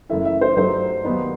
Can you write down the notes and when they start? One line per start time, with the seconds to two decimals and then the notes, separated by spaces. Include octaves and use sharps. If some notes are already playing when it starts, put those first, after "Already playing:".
0.09 F#1 F#2 E3 A3 E4 E5
0.25 E5
0.41 C5
0.57 G2 F#3 A3 D#4 C5
1.04 D#2 D#3 F#3 B3 D#4